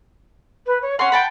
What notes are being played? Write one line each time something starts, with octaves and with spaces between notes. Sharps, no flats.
B4
C#5
C#4 F#5 C6
G5 A5 B5